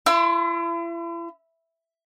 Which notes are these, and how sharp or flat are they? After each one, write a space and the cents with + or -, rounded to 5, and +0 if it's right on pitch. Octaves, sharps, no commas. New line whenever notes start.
E4 +40 C6 +0 E6 +30